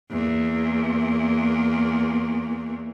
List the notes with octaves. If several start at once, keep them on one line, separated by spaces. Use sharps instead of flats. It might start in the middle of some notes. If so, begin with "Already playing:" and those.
E2 A#3